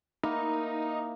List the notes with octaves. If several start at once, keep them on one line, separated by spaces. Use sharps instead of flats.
A#3 D#4 E4